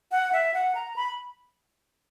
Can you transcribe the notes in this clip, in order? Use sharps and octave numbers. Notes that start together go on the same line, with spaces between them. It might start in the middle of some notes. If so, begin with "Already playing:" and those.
F#5
E5
F#5
A#5
B5